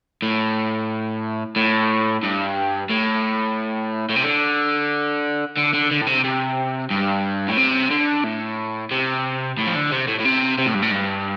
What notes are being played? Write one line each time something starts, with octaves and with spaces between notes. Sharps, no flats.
A2
A2
G2
A2
A2
C3
D3
D3
D3
D3
A2
C3
C3
G2
A2
C3
D3
A2
C3
A2
F3
D3
C3
A2
A2
C3
C3
A2
G2
A2
G2